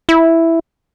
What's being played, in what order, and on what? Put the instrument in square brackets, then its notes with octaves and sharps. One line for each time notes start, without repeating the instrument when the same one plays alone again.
[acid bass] E4